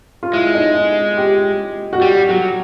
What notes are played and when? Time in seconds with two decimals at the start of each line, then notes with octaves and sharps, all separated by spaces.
0.23 F4
0.33 G#3 E4
0.55 D#4
0.75 D#4
1.17 G4
1.93 F#4
2.01 G3 G4
2.29 F#3 F#4